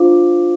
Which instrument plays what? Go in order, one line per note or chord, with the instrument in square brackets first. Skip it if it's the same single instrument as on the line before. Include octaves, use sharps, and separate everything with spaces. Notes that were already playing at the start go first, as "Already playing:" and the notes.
Already playing: [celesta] D4 F4 C5 F5 D6